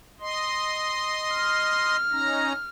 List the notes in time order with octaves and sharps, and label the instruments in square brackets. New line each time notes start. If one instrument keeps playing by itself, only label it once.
[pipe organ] D#5 C6
[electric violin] F6
[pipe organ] C#4 D#4 A#5